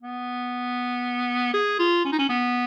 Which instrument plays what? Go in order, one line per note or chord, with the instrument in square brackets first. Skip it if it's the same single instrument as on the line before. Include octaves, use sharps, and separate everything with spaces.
[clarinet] B3
G#4
F4
C#4
D#4
C#4
B3